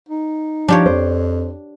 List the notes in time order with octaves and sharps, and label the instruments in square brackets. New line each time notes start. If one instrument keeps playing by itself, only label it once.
[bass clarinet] D#4
[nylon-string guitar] F3 [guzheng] D4 G4 C#5
[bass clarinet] F2 [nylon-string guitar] C5